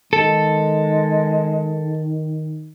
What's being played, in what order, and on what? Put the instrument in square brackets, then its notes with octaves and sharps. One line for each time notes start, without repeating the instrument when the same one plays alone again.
[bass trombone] D#3 [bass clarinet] G#3 [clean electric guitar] A4